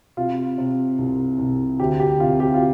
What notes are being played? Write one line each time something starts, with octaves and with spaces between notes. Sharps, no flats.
C3 F4
C3
C2
C2
D2 G4
G4
C3 F4
G4
F4